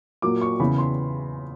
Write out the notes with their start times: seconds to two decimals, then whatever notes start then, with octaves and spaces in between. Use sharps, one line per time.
0.22 A#2 F#3 A#3 D6
0.42 C#6
0.60 E2 C#3 E3 B5
0.78 C6